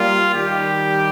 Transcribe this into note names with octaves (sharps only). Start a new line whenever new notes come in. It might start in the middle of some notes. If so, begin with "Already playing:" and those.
Already playing: G3 A#3 F4
D#3 G3 G4